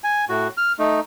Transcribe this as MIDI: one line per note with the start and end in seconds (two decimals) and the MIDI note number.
0.04 0.25 80
0.29 0.48 45
0.29 0.48 66
0.57 0.72 89
0.79 1.00 57
0.79 1.00 63